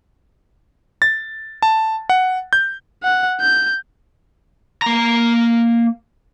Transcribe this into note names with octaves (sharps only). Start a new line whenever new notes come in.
A6
A5
F#5
G6
F#5
G6
A#3 A#5